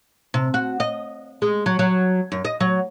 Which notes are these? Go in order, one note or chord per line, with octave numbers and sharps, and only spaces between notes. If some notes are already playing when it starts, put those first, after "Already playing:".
C3
F#4
D#5
G#3
F#3
F#3
F#2
D#5
F#3